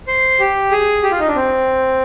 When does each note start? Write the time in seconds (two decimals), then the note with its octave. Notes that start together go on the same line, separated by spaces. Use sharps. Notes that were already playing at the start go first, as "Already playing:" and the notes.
0.07 C5
0.40 G4
0.71 G#4
1.03 G4
1.11 F4
1.19 D#4
1.28 D4
1.36 C4